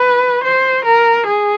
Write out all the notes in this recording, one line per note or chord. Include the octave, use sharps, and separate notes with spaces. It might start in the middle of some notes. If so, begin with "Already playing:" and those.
Already playing: B4
C5
A#4
G#4